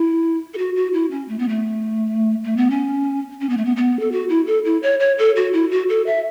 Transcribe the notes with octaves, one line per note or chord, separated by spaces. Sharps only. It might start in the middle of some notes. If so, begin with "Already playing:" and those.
Already playing: E4
A4
F#4
F#4
E4
C#4
A3
B3
A3
A3
B3
C#4
C#4
B3
A3
B3
B3
A4
F#4
E4
A4
E4
C#5
C#5
A4
F#4
E4
F#4
A4
E5